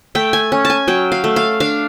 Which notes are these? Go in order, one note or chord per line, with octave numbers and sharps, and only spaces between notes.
A3 G5
G#5
C#4
A5
G#5
F#3 G5
F5
A3
F5
D4 F5